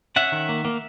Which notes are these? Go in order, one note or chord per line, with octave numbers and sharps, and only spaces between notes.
C#4 E5 F#5
D#3
A#3
A#3